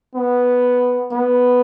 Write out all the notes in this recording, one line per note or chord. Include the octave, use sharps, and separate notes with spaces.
B3
B3